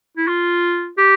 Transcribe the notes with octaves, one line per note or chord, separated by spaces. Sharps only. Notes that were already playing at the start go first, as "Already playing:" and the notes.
E4
F4
G4